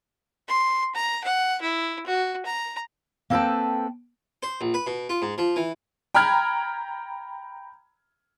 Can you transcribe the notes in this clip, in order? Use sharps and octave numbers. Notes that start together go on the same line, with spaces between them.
C6
A#5
F#5
E4
F#4
A#5
A#3 C4 A4 B4 G5 A5
C5
A#1
B4
B2
F4
G#2
F3
E3
G5 A#5 B5 F6 G#6